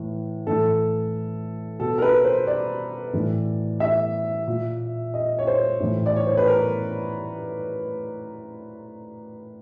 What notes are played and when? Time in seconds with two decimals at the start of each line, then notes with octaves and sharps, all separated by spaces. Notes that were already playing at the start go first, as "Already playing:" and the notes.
Already playing: A2 E3
0.47 A2 E3 A4
1.80 B2 A4
1.98 A#4
2.02 B4
2.25 C5
2.47 D5
3.13 A2 E3
3.80 E5
4.48 A#2
5.14 D#5
5.39 C#5
5.47 C5
5.80 A2 E3
6.06 D5
6.16 C#5
6.27 C5
6.37 B4
6.47 A#4